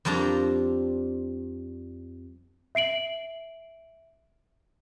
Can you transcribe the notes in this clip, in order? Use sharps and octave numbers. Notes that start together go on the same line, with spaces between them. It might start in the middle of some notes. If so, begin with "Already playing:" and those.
F2 G3 C4 D4 A#5
E5 C7 D7 F#7